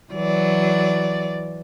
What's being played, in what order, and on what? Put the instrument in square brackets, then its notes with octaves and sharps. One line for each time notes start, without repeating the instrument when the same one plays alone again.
[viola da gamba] E3 F#3 D5